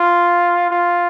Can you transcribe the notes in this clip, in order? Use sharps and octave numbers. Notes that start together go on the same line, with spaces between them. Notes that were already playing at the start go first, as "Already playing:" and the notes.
Already playing: F4
F4